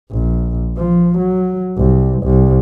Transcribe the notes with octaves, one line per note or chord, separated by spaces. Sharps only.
A#1
F3
F#3
C2
C2